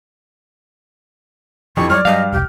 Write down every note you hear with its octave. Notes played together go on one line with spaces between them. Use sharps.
F2 E3 F3 D4 G4 C#6
F#3 G3 C#5 D5 F6
G2 F#3 D#5 F5
E1 C2 G4